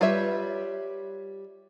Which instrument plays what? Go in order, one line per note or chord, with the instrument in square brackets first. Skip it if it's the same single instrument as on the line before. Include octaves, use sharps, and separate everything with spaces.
[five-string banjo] G3 F4 B4 C#5 E5